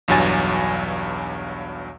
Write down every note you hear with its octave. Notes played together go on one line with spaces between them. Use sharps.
B1 E2 G2 F#3 G#5 A6